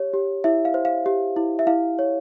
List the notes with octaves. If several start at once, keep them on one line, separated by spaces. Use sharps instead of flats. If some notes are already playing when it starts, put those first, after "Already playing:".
Already playing: G4 C#5
G4
E4 E5
F5
C5
F5
G4
E4
E5
E4 F5
C#5